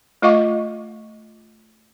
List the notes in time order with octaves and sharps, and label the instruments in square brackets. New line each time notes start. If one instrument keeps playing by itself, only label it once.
[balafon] A3 F4 D#5 F5 C#6 D6